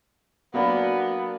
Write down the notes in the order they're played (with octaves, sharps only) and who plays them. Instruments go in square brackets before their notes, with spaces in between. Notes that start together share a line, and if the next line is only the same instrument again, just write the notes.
[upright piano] F#3 A#3 D4 [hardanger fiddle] B3